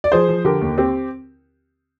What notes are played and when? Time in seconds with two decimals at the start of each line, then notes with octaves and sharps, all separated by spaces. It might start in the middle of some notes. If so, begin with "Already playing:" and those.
0.04 D5
0.12 F3 G#4 C5
0.28 F3
0.45 D3 G4 A#4
0.61 D#2
0.78 C4 G4